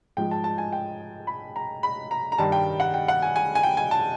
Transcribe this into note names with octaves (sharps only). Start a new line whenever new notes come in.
G#2 F3 G#3 G5
A5
A5
G#5
G5
B5
A#5
B5
A#5
A#5
G2 D#3 G3 A5
G5
F#5
G5
F#5
G#5
G#5
G#5
G5
G#5
A5